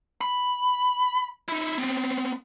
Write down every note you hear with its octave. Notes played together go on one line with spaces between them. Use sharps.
B5
D#4 E4
B3 C4